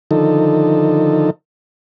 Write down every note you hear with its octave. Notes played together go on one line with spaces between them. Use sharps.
D3 D#3 F3 D#4 A4